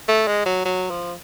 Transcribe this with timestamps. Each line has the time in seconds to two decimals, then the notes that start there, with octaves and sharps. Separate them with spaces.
0.08 A3
0.27 G#3
0.46 F#3
0.65 F#3
0.90 F3